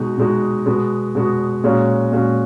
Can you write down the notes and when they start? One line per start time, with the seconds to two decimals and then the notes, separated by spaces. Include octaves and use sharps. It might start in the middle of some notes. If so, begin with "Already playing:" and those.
Already playing: B2 G#3 D#4 F#4
0.18 B2 G#3 D#4 F#4
0.66 B2 G#3 B3 F#4
1.15 B2 G#3 B3 F#4
1.64 A#2 G#3 C#4 F#4
2.12 A#2 G#3 C#4 F#4